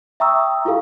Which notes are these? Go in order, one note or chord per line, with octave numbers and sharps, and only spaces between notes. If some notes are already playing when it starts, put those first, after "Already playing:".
E5 G5 A#5 C#6 D#6 E6
E4 F4 G4 A4 F5